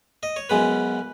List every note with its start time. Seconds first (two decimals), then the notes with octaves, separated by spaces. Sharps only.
0.23 D#5
0.36 C#5
0.49 F#2 C#3 G#3 B3 B4